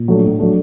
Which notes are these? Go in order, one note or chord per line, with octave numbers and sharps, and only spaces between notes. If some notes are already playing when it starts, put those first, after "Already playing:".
Already playing: A#2
F#3 A3 D4
A2
F#3 A3 D4